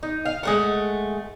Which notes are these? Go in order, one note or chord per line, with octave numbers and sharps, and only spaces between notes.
D#4
F5
G#3 A3 F#5